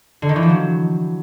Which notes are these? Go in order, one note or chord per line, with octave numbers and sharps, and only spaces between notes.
D3
D#3
E3
F3
F#3